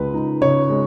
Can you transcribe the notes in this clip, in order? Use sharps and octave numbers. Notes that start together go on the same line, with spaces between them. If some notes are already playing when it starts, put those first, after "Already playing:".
Already playing: C#2 C#3 G#3 B4
D#4
C#3 C#5
G#3